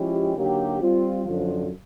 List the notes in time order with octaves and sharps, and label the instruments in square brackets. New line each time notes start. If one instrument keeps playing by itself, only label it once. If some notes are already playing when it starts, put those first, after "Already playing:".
Already playing: [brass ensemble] F3 G#3 C#4 E4 G4
D3 F#3 A#3 D#4 G4
G3 C4 F4
F#2 D3 F3